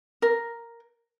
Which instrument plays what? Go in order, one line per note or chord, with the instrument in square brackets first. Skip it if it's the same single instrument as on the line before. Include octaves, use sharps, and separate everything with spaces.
[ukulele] A#4